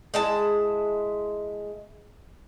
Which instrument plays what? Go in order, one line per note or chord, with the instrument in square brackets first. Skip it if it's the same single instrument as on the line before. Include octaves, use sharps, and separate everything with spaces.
[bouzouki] G#3 E4 A5